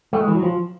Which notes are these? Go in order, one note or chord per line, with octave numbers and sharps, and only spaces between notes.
A3
G#3
E3
F#3
F3